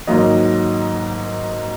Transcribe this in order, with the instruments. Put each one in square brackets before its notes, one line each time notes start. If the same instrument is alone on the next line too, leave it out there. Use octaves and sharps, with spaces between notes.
[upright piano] G#2 D#3 F#3 A#3 D#5